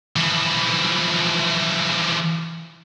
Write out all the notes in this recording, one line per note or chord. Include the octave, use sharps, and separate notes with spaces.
E3 F3